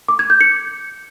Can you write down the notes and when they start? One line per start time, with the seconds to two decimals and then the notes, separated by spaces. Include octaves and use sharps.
0.08 D6
0.19 G#6
0.30 G6
0.41 C#7